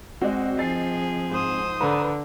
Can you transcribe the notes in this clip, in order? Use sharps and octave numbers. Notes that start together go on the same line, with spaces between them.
G#3 C4 F#4 D5 D#5
F3 G#4 D#5 A6 C7
G#2 C5 D#6
D3 B4 A#5